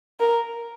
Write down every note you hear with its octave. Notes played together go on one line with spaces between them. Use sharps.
A#4